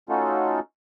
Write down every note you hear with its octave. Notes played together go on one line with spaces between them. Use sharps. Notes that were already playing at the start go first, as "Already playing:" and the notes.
A3 C#4 D#4 F4 F#4 A4